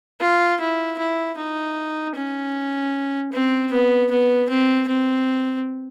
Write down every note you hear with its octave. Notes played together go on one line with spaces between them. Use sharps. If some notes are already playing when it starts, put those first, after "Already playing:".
F4
E4
E4
D#4
C#4
C4
B3
B3
C4
C4